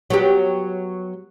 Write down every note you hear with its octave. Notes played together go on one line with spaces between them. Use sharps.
F#3 B3 G4